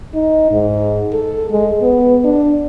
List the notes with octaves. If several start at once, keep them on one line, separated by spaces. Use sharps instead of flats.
D#4
G#2
A4
G#3
B3
D4